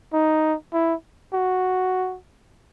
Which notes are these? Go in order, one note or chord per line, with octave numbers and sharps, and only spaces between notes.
D#4
E4
F#4